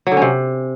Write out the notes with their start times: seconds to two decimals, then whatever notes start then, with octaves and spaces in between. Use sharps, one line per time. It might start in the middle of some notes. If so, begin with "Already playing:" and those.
0.07 F#3
0.12 D3
0.17 C#4
0.22 C3